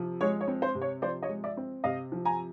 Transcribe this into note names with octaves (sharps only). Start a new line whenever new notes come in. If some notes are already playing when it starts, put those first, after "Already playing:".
Already playing: C3 F3
G#3 C#5
C#5
C4
C5
C3
C#5
F3 C5 D5
C#5 D#5
G#3
D5 E5
C4
C3 D#5 F5
F3
G#5 A#5